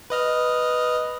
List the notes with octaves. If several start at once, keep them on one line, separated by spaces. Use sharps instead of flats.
B4 D#5 F6